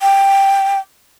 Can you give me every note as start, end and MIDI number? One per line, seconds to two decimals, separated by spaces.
0.02 0.79 79